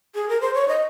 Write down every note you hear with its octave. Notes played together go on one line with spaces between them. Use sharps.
G#4
A#4
C5
C#5
D#5